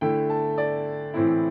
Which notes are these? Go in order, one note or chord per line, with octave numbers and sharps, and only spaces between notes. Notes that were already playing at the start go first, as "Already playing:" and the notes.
D3 A3 E4 G5
A5
D5
A2 E3 C4 E4